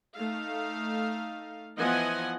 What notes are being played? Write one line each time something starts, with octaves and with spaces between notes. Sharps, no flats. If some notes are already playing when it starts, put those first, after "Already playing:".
A3 D#4 F5
E3 F3 B3 D#5 F#5 G#5